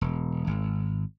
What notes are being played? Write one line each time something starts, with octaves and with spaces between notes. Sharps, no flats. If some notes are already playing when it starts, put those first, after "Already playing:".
E1
G#1